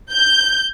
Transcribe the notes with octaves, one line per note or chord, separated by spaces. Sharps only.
G6